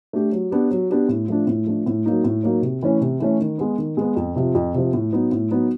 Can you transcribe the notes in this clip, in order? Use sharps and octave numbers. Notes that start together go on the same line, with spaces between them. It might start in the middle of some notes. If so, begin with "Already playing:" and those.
A3 D4 G4
F#3
B3 D4 G4
F#3
B3 D4 G4
A2
F3 A3 D4
A2
F3 A3 D4
A2
F#3 A#3 D#4
A2
F#3 A#3 D#4
C3
E3 A3 C#4
C3
E3 A3 C#4
D#3
G#3 B3
D#3
G#3 B3
F2
C3 F3
F2
C3 F3
A2
F#3 B3 D#4
A2
F#3 B3 D#4